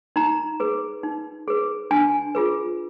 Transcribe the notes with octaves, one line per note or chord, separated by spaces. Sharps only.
D#4 A#5
G#4 B4
D#4
G#4 B4
D4 G#5
F4 G#4 B4